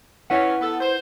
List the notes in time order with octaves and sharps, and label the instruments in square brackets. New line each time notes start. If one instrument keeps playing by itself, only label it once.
[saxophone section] E3 C#4 [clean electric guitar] E4 B4 F#5
[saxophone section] B3 A4
C5